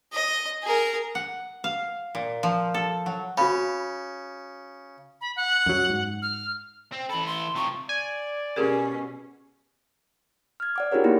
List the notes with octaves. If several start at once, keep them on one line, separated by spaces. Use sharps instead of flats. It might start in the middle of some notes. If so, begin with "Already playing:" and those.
D#5
G#4 A#4
F#5
F5
A#2
F3
A4
F#3
C#3 F#4 B5
B5
F#5
F#2 F#3
G#2
F6
C4
E3 A4 B5
C6
C3 F3 C#6
D5 G#5
B2 C#4 G4 G#4 A#4
F6 G#6
D5 F#5 D6
D4 F4 G4 G#4 A#4 C#5
A#3 B3 D#4 E4